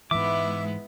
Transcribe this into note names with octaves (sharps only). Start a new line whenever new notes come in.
G#2 E3 G#3 B3 E4 E5 D6